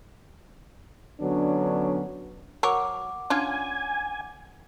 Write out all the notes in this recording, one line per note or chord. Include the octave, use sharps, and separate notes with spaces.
D3 F#3 B3 C#4 D4
F#3 A#4 C#5 F#5 D6
C#4 D4 F4 G#5